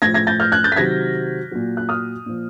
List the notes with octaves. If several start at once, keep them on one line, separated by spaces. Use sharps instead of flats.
A2 F3 G#6 A#6
G#6 A#6
G6 A6
F6 G6
F#6 G#6
G6 A6
B6
C3 D#3 F#3 G#6 A#6
A#2 F#3
F#6
D#6 F6
A#2 F3